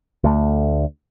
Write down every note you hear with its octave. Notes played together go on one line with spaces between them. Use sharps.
D2 A3